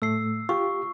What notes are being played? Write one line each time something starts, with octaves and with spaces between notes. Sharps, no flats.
A2 A3 E6 C7
F4 G4 C#6